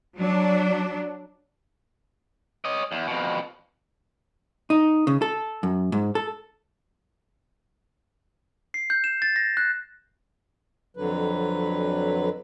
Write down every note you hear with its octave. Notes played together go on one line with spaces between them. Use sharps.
F#3 D4
C#5 D#5
E2
F2 B2
D#4
C#3
A4
F#2
G#2
A4
C7
G6
E7
A6
A#6
F#6
F2 D3 F#3 B4